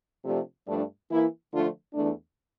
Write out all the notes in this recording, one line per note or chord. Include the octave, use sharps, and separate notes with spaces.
C3 F3 A3 D4 G4
G2 F3 A3 D4
E3 A#3 E4
D3 F3 A3 D4 F4
E2 E3 A3 D4